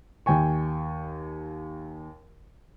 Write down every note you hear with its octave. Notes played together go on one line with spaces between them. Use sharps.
D#2 G5 G#5 C#6